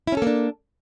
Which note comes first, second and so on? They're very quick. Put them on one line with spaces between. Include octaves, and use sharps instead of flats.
E4 C#4 A4 A#3 D4